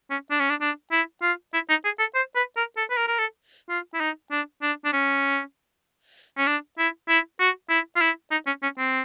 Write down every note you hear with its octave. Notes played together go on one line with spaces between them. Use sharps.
C#4
D4
C#4
D4
D4
E4
F4
E4
D#4
G#4
A4
C5
B4
A#4
A4
B4
A#4
A#4
A4
F4
E4
D#4
D4
D4
D4
C#4
C#4
D4
E4
E4
F#4
E4
F4
E4
D#4
C#4
C#4
C4